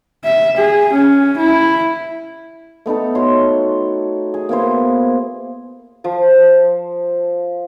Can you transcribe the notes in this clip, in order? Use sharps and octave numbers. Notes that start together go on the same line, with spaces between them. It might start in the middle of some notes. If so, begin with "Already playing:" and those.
E5
G#4
C#4
E4
A3 B3 D#4 A4
F#4 C#5 C6
G#4
A#3 B3 E4 C5
F3 C5